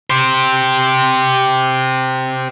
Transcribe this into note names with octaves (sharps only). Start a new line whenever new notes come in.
G4 C5